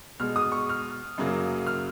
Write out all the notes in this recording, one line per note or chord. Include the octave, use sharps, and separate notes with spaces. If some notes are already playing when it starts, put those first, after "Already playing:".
B2 G#3 F6
D#6
C#6
F6
F#2 C#3 F#3 A#3
F6